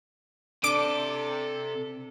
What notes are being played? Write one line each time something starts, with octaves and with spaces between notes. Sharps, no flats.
C3 D4 A4 D6 D7